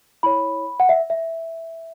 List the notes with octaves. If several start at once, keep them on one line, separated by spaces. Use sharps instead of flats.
E4 C#5 B5
F#5
E5
E5